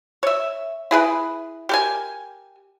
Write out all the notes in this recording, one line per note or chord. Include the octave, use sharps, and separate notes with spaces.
C#5 E5
E4 G#4 B4
G4 A#4 G#5